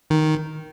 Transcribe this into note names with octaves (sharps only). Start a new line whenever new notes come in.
D#3